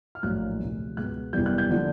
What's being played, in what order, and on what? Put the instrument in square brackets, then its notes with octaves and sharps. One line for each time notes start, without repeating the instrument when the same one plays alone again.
[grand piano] F6
A#1 A2 F#3 A#3 F#6
D2 C3 F3
C#2 B2 G#3 B3 F#6
F#1 E2 C3 E3 G3 G6
F#6
G6
D3 F3 A#3